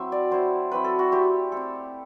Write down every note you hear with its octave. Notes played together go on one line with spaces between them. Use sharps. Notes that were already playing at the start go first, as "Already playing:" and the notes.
Already playing: F#3 C4 E4 E5
D5
F#3 C4 E4 C5
F#3 C4 E4 B4
A4
F#4
A3 C4 E4 G4
A3 C4 E4 A4